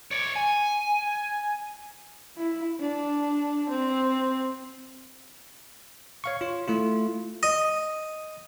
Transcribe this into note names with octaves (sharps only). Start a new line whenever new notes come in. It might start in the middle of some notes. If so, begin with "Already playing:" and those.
C#5 D5
G#5
E4
D4
C4
C#5 F5 C#6
F4 C#5
A3 E4 F4
D#5